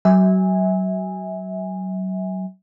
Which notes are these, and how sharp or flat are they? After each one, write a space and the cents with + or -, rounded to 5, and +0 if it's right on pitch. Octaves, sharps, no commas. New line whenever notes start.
F#3 +30 E5 -25 G#5 -15